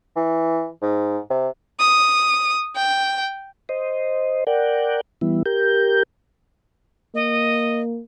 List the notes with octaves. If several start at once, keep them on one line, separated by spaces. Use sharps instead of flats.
E3
G#2
C3
D#6
G5
C5 D#5
A#4 D5 F#5 G5
E3 G3 B3 E4
G4 A#4 G6
A#3 D#5